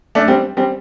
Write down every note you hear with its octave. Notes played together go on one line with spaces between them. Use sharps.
A3 D4
G3 C4
G3 C4